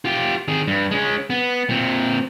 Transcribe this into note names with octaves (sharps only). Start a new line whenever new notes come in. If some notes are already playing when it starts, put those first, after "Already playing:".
F4 G4
D#3 G#4
G2
G#3 C#4
B3
A#2 C4